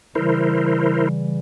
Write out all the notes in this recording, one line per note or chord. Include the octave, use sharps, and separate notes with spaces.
C#3 E3 G3 E4 A#4 C5